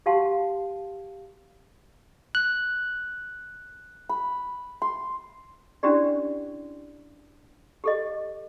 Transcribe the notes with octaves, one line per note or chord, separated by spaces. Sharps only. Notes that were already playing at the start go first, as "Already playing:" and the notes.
F#4 G4 F5 F#5 A5 C6
F#6
B5
C6
C#4 D4 E4 F#4 G4 D5
G4 A4 D#5